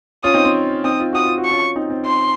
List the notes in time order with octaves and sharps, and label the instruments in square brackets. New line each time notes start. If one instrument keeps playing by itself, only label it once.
[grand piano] C#4 F4 [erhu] D#6
[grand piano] C4 D#4
C4
[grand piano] C4 D#4 [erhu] D#6
[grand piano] F4
[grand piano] F#4 [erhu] D#6
[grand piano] F4
F#4
[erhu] C#6
[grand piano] C#4 F4
C4 D#4
C4
[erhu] C6